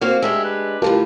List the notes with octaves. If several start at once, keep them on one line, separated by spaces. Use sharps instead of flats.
A#3 C4 F#4 F5
G#3 D4 G4 E5
B4
A2 D3 F4 G4 A#4 A5